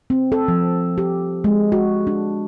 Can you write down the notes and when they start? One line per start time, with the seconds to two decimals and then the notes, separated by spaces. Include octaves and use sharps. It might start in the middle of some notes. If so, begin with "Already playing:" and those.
0.10 C4
0.32 A4
0.48 F3
0.98 G4
1.44 G#3
1.72 F#4
2.07 D4